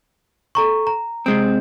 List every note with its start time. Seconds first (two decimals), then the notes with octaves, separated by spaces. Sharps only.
0.55 A4 A#5 C#6
0.87 A#5
1.26 C3 G#3 C4